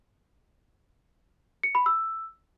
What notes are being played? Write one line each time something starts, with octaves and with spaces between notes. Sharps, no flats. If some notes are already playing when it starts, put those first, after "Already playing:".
C#7
B5
E6